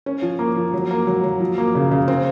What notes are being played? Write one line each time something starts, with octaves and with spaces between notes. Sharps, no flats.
C#4
F3
A#3
F3
F#3
A#3
F#3
F#3
F3
A#3
C#3
C#3
C4